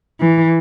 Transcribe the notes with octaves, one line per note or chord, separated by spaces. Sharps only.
E3